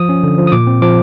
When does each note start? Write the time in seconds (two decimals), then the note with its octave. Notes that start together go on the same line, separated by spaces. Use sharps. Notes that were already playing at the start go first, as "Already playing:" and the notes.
Already playing: F3 D#6
0.09 C#4
0.23 D3
0.38 F3
0.47 D#6
0.52 A#2 D6
0.67 C4
0.82 F3 D6